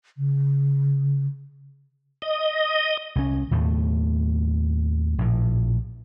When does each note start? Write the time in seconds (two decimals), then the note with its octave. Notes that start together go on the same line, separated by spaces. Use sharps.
0.17 C#3
2.22 D#5
3.16 C2 C#4
3.51 D#2 A2 A3
5.18 A#1 A2